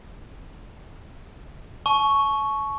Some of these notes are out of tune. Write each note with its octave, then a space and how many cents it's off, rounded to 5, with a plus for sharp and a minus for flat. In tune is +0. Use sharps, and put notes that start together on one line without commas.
A5 -40 C#6 +0